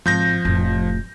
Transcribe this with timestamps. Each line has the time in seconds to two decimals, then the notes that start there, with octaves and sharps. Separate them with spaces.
0.06 G#1 F3 G6 A#6
0.45 F1 A2